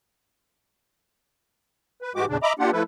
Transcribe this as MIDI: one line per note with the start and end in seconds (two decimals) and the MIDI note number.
2.02 2.12 71
2.16 2.25 44
2.16 2.25 52
2.16 2.25 56
2.16 2.25 66
2.16 2.25 67
2.16 2.25 86
2.29 2.37 40
2.29 2.37 46
2.29 2.37 49
2.29 2.37 62
2.43 2.53 75
2.43 2.53 76
2.43 2.53 82
2.43 2.53 83
2.43 2.53 86
2.59 2.71 58
2.59 2.71 62
2.59 2.71 65
2.59 2.71 67
2.59 2.71 78
2.73 2.83 53
2.73 2.83 57
2.73 2.83 64
2.73 2.83 69
2.73 2.83 71